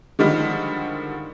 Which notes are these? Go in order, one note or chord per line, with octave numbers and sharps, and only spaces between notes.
D3 D#3 F3 G3 G#3